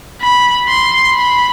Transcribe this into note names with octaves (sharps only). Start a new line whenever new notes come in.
B5
C6
B5